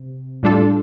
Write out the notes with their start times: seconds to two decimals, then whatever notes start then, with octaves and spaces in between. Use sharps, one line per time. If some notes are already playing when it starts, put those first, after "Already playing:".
Already playing: C3
0.43 A2 G3 D4 F4 A4